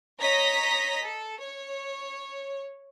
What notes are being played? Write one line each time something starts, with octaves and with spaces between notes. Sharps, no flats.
C#5 D#5 A#5 A#6 B6
A4
C#5